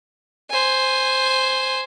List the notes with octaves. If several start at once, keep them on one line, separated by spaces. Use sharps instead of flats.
C5 G#5